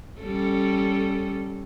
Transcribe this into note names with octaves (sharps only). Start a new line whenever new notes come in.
G3 C#4 A4